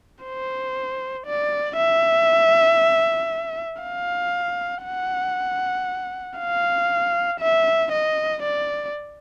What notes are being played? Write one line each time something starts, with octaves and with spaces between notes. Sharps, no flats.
C5
D5
E5
F5
F#5
F5
E5
D#5
D5